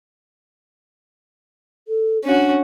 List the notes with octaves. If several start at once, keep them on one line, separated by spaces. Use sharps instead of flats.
A4
C#4 D4 F#4